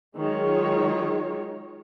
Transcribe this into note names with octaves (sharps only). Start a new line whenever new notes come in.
D#3 F#3 G#3 F4 C#5